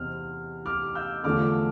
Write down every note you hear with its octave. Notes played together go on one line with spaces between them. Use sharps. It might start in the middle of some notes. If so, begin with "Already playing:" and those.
Already playing: E2 C3 C4 F6
D6 F6
E6 G6
E2 D3 F3 A3 D6 F6